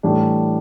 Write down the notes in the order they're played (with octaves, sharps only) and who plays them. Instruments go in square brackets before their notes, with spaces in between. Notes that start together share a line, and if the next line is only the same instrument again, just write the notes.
[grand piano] A2 E3 G3 D4